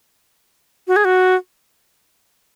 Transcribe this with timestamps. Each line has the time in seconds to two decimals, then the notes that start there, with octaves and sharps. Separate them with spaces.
0.88 F#4
0.96 G#4
1.05 F#4